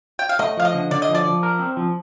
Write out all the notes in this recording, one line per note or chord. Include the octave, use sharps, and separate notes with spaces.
G5
F5
A3 D#5
F3 F5
D#5
D3
D3 D5
D#5
F3
D5
F3
A#4
C4
F3